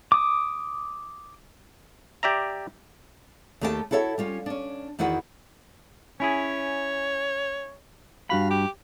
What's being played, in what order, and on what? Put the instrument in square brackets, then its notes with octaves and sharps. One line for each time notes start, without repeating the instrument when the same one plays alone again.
[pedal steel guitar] D6 D#6
[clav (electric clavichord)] G4 D5 E5 A#5
[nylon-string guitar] D#2 A3 G4 A#4 F#5 A5
E4 F#4 A4 C#5 E5
G3 C#4 F4
C#4 D4
E2 D#3 E4 F#4 B4 F#5
[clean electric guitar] C#4 E4 G#4 [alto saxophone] C#5
[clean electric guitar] G2 F#4 B5 [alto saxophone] F5
[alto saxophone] G4